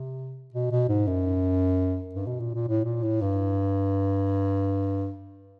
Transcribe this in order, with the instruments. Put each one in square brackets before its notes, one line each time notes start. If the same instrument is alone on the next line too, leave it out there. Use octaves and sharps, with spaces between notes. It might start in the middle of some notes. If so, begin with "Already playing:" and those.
Already playing: [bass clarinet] C3
B2
B2
G#2
F#2
G2
B2
A#2
A#2
A2
A#2
A2
G2